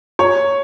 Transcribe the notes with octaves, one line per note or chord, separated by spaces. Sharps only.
C#5